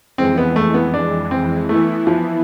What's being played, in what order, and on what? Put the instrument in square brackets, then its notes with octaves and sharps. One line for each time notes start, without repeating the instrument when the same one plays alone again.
[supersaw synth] F2 E3 G#3 [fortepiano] C4
[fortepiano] B3
A3
B3
D4
C4
[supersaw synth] E3 B3 E4 [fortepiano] A3
[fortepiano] F3